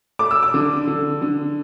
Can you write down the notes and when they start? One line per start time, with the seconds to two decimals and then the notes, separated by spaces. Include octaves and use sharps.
0.19 A3 D6
0.31 E6
0.42 D6
0.54 D3
0.87 D3
1.22 D3